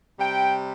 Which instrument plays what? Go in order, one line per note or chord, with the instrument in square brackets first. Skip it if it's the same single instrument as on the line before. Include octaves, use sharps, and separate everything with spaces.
[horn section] C3 G3 G5